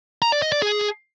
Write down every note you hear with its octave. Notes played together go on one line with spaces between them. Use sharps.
A#5
D5
D#5
D5
G#4